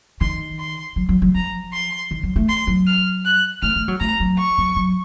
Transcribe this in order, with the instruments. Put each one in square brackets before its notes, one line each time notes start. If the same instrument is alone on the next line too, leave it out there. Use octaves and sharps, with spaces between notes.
[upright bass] D#3 [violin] C6
[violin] C6
[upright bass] F#3
F#3
F#3
[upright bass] F3 [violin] A#5
[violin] C6
[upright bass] D#3
F#3
A3
[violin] C6
[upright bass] F#3
[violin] F6
F#6
[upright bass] A3 [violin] F6
[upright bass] A3
F#3
[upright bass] A3 [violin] A#5
[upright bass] F#3
[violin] C#6
[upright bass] F#3
F#3